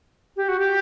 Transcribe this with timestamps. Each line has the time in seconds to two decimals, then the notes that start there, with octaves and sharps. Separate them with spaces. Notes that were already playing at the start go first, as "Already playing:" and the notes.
0.37 G4
0.48 F#4
0.59 G4